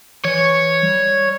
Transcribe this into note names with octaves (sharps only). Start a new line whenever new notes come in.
E3 C#5
G3